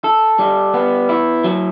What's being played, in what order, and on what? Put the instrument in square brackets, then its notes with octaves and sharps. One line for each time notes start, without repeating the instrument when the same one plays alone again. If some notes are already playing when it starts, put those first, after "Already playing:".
[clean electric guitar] A4
G3
B3
E4
F#3